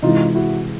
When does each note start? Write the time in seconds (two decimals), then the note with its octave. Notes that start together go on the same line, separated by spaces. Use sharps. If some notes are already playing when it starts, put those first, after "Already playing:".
0.02 C3 E3 G#3 D#4 F4
0.35 E4 F#4